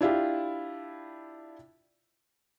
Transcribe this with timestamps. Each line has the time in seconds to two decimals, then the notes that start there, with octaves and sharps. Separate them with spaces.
0.01 D4 E4 F4 G4